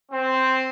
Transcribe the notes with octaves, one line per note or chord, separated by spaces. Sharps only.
C4